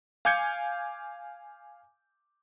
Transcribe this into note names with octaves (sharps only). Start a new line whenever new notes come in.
F5 G#5 D6 G6 G#6 C#7